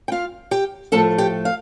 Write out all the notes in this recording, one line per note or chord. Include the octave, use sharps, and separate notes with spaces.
G5
F4 F5
G4 G5
A2 F3 A3 A4 A5
G4 G5
F5